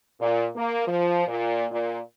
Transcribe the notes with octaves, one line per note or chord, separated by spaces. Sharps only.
A#2
A#3
F3
A#2
A#2